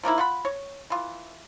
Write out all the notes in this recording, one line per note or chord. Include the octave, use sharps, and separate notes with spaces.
F3 A#3 D#4 E4
F4 F#5 B5
C#5
E3 F4